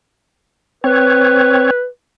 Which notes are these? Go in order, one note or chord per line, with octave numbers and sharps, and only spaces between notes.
C4 B4 C#5